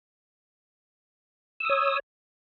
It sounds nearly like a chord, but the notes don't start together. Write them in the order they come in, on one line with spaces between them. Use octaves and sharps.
E6 D#6 C#5